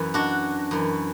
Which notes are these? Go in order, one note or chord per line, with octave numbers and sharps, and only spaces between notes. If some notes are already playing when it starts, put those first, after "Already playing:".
Already playing: F#2 E3
D4 F#4
F#2 E3